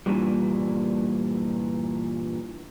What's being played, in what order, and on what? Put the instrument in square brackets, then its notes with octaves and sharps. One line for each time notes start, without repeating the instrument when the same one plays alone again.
[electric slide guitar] G2 A#2 E3 G3